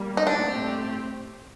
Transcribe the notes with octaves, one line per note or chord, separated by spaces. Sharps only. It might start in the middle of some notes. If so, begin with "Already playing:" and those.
Already playing: G3 A#3
D#4
D4
A2 A3 C4 G4